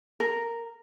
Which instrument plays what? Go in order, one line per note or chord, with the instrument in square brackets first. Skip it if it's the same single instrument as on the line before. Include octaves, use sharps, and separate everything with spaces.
[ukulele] A#4